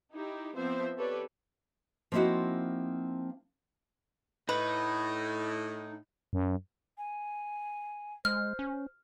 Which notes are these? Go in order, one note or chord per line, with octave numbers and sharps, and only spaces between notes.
D#4 E4 G4
F3 B3 C4 C5 E5
G4 A4 B4 C#5 D5
F3 A#3 C4 D#4 E4 F#4
A2 D#4 B4
F#2
G#5
G#3 C5 F6
C#4